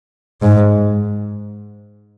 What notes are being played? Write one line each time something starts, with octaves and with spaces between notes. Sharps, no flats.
G#2